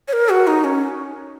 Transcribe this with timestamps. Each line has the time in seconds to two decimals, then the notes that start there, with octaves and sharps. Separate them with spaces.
0.08 C#5
0.13 A#4
0.29 F#4
0.47 D#4
0.64 C#4